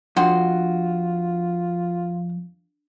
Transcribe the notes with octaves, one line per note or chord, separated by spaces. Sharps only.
F2 D4 F4 F#4 C6